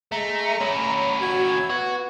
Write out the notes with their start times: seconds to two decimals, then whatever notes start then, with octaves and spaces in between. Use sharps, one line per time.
0.12 G#3 A3 A#5
0.61 C#4 E4 C#5
1.21 F#4 G#6
1.70 B3 F#4